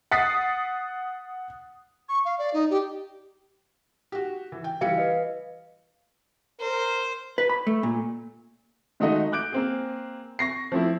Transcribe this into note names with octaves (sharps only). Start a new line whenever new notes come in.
F#5 D#6 A6 B6 C7
C#6
F5
D5
D#4
G4
F#4 G4
E3
G5
E3 G3 F5 C#7
B4 D#5
A#4 C5
B4
B5
A3
A#2
D#3 G#3 A3 D#4 F#4 D#5
D6 F#6 G6 D7
A#3 C4 G#4
C#6 A#6 C7
F3 A3 C4 E4